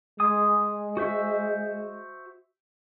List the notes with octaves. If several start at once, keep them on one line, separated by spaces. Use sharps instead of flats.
G#3 G#5 C6 D#6
F#4 C5 E5